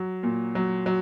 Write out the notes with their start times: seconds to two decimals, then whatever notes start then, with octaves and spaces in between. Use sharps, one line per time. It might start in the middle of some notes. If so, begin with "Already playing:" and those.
Already playing: F#3
0.23 A#2
0.55 F#3
0.86 F#3